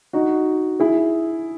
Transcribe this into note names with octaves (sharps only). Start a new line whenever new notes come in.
D#4 F#4
E4 G#4